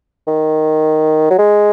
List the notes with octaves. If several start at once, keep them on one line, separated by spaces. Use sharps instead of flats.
D#3
F#3
G#3